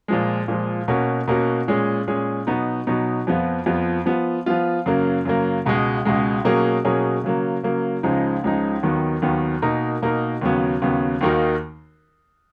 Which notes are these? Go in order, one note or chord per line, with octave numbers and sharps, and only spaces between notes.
A#2 F3 G#3
A#2 F3 G#3
B2 A#3 C#4 F#4
B2 A#3 C#4 F#4
A#2 G#3 C#4 G#4
A#2 G#3 C#4 G#4
B2 F#3 B3 D#4
B2 F#3 B3 D#4
F2 F3 B3 F4
F2 F3 B3 F4
F3 B3 F4
F3 B3 F4
F#2 C#3 F#3 A#3
F#2 C#3 F#3 A#3
C#2 B2 G#3
C#2 B2 G#3
B2 F#3 A#3 C#4 G#4
B2 F#3 A#3 C#4 G#4
C#3 F#3 A#3
C#3 F#3 A#3
C#2 C#3 F3 G#3 D#4
C#2 C#3 F3 G#3 D#4
D#2 D#3 F#3 B3
D#2 D#3 F#3 B3
B2 A#3 D#4 A#4
B2 A#3 D#4 A#4
D#2 C#3 F#3 B3
D#2 C#3 F#3 B3
D#2 D#3 A#3 D#4 F#4